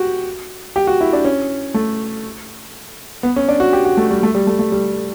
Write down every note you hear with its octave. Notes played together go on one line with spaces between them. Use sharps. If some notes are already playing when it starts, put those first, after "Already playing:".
Already playing: F#4 G4
G4
F#4
E4
D4
C#4
A3
B3
C#4
D4
F#4
G4
F#4
A3
G3
A3
G3
A3
A3
G3